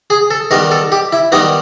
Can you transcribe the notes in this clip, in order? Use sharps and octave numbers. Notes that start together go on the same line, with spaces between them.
G#4
A4
D#3 G3 B3 A#4
A4
G4
E4
D#3 G3 B3 D#4